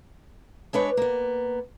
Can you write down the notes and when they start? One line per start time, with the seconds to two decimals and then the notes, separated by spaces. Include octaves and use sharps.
0.73 G#3 D4 B4 C#5
0.97 A#3 B3